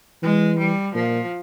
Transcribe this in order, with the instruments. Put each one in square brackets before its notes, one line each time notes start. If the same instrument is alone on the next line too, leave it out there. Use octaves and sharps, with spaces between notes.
[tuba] E3 [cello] G#3
[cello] G3
[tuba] A#2 [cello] F3